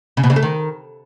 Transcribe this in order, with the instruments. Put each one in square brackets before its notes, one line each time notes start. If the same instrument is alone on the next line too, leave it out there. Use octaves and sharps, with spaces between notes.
[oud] C#3
B2
C#3
A3
D#3